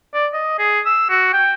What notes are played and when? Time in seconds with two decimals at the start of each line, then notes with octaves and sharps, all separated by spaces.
0.14 D5
0.33 D#5
0.59 G#4
0.86 E6
1.09 F#4
1.33 G5